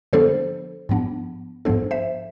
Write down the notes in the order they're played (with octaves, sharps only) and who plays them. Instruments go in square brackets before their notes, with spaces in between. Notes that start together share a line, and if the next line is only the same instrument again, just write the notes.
[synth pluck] D3 F3 B3 D4 A4 C5
G#2 F3 B3 D4
G#2 F3 B3 D4 A4 C5
C5 E5